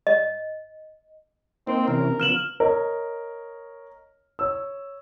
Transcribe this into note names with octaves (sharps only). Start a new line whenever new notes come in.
D#5
A#3 C4 D#4 C5
C3 E3 C#4 A#4
C#3 F3 B3 F6 E7 F#7
A#4 C#5 D#5
C#5 E6